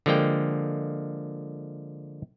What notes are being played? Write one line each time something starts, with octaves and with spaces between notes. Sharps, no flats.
D3 F3 G#3 A#3 G5